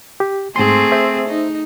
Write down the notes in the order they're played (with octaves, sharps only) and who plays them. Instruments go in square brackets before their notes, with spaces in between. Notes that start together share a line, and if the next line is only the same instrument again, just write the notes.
[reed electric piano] G4
[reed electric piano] G#2 C6 [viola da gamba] A3 C4 G#4
[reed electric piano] C5 E5
[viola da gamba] D#4